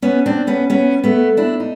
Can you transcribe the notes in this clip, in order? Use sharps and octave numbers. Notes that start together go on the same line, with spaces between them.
B3 C#4
C4 D4
B3 C#4
B3 C#4
A3 B3
D4 E4
D#4